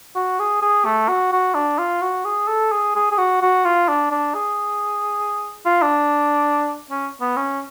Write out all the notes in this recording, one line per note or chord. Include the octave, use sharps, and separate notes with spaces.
F#4
G#4
G#4
A3
F#4
F#4
D4
F4
F#4
G#4
A4
G#4
G#4
G#4
F#4
F#4
F4
D4
D4
G#4
F4
D4
C#4
B3
C#4